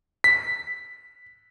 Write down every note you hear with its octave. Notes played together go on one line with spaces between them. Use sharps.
B6